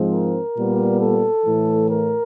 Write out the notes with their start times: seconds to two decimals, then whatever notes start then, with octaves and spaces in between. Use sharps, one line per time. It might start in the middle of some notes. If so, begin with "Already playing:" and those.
Already playing: G#2 F3 G#3 C4
0.12 A#4
0.56 A#2 G3 B3
1.01 A4
1.46 A2 E3 A3
1.89 A#4